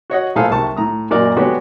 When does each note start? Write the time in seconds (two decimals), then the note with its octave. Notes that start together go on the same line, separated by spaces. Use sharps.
0.10 F#4 C#5 D#5 F#5
0.36 A#1 A2 G#4 A4 C5 F5
0.50 C2 C3 D#3 A5 C#6
0.76 A2 A#5 D#6
1.10 F#2 A#2 F#4 A#4 D5 D#5
1.37 D3 G#3 B3 F#4 G4 C#5